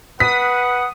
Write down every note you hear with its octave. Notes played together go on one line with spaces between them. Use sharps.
B4 F#5 D#6 B6